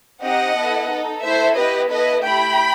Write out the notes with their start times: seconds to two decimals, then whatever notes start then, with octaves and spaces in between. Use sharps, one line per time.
0.22 C4 D#4 G4 D#5 F#5
0.55 B3 E4 A4
0.89 D#4 A4
1.22 A3 E4 A4 C5 E5
1.56 B3 E4 G4 B4 D#5
1.89 B3 E4 A4 B4 D#5
2.23 A3 E4 G4 G5 B5